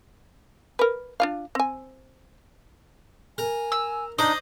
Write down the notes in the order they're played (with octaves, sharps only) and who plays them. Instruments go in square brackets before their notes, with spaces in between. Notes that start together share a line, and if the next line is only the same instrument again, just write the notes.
[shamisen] A#4 B4
D4 F4 F5
C4 G#5
[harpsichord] A#4 [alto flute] G#5
[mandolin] E6
[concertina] D4 D#4 [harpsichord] C5 D5 [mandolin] D#5